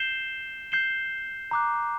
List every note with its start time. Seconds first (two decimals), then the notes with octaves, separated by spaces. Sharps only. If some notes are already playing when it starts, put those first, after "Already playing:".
Already playing: G6 C7 E7 G7
0.72 G6 C7 E7 G7
1.51 A#5 D6 F#6